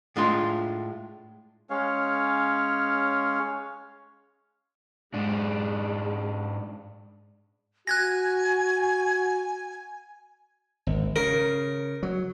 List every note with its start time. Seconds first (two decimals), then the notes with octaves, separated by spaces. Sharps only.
0.16 A2 G#3 D4 F4 C6
1.70 G#3 C#4 C#5 F5
5.14 G#2 G#3 D4
7.87 F#4 G#5 F#6 G#6 A#6
10.87 G#1
11.16 C#3 A#4
12.03 F#3